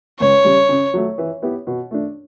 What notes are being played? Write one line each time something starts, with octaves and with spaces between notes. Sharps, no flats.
C#2 C#5
C#3 G3
C#3
F#3 A3
E3
B3 E4 G4
B2
A3 D4